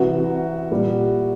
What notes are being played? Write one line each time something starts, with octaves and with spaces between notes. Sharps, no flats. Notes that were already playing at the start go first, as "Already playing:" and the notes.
Already playing: C2 C3 E3 F#4
A#2 G3